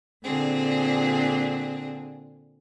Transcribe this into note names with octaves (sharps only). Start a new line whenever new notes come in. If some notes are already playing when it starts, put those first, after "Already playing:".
A#2 D3 C4 G#4